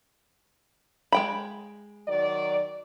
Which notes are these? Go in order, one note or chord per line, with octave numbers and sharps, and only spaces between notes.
G#3 G5 B5
D#3 F#3 D5